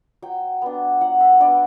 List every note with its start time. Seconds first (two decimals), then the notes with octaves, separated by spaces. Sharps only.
0.22 F#3 G5
0.62 B3 D4
1.01 F#3 F#5
1.21 E5
1.40 B3 D4 D5